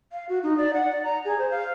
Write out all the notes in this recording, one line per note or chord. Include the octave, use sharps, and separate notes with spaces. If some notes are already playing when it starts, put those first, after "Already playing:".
F5
F#4
D#4
D5
F#5
D5
A#5
G#4
C5
F5